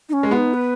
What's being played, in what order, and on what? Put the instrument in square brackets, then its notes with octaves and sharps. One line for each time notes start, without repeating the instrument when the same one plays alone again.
[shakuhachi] D#4
C#4
[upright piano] G#3
[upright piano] B3 [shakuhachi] F#4
[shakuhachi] D#4
B4